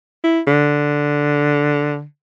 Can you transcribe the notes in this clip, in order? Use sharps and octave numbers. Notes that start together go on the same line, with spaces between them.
E4
D3